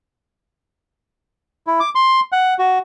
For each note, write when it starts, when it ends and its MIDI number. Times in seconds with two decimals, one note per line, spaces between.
1.67 1.80 64
1.80 1.90 86
1.95 2.20 84
2.32 2.54 78
2.59 2.79 66